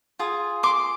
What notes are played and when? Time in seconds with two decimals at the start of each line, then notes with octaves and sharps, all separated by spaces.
0.19 F4 G#4
0.63 C6 D6